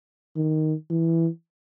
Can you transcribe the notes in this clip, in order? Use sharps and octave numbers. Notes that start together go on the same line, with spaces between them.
D#3
E3